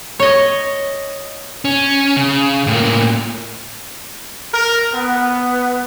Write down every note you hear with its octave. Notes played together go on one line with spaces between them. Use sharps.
C#5 D#5
C#4
C#3
A2 A#3
A#4
B3